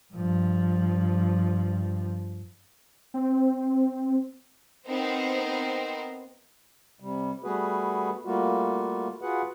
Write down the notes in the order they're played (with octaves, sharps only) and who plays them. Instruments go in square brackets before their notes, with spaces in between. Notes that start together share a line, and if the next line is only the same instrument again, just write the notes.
[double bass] G2 F3
[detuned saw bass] C4
[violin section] B3 C4 D#4 A#4 C5
[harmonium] C3 G3
G3 A3 B3 F#4 G#4 B4
G3 A3 A#3 F4 F#4
F4 F#4 G#4 B4 F#5